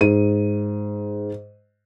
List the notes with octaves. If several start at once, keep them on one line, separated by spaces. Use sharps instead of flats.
G#2 D#7